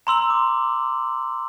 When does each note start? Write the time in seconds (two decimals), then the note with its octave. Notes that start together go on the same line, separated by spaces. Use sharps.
0.07 A#5 C6 E6 F#7
0.30 D6